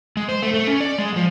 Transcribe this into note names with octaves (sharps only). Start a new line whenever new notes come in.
G#3
C5
A3
A3
C#4
D5
G#3
F3